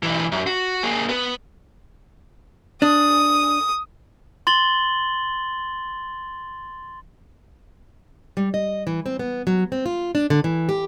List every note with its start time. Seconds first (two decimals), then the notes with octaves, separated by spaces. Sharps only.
0.03 B1 E3
0.32 F#2
0.47 F#4
0.83 A#3 G#4
1.09 B3
2.82 D4 D#6
4.47 C6 A6 F#7 G7
8.37 G3
8.54 D#5
8.87 E3
9.06 C4
9.19 B3
9.47 F#3
9.72 C4
9.86 F4
10.15 D4
10.30 D3
10.44 E3
10.69 G4